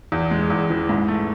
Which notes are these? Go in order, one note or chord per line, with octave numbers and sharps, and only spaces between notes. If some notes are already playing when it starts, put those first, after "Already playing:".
E2
G#3
E2
E3
G#2
A3